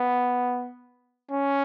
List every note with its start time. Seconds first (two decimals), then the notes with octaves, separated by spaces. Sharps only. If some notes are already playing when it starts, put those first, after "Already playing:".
Already playing: B3
1.31 C#4